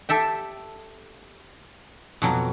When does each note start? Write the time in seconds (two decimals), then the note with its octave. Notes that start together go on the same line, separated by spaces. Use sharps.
0.09 G4 A4 E5 G5
2.22 F2 B2 F#3